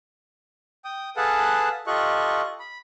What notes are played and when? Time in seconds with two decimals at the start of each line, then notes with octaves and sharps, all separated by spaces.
0.85 G5 D#6
1.17 G#4 A4 B4 F5 F#5 A5
1.87 F4 G4 A4 D#5 C#6 F#6
2.60 B5